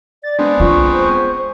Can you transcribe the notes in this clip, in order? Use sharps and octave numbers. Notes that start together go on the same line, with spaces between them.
D5 A6
G#3 B3 C4 D4
F4 C#6
C5